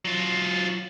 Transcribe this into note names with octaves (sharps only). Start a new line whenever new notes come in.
F#3 F4